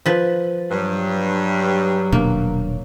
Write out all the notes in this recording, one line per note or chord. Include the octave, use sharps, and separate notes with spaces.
F3 B4
G2 F#3
D#1 B2 A#3 D4